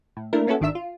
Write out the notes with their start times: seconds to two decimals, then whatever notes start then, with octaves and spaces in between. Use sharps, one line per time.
0.17 A2
0.33 A3 A#3 D4 E4 A#4
0.47 A#3 B3 C#4 E4 F#4 A4
0.60 G#1 D#3 D4 E5 E6
0.75 F4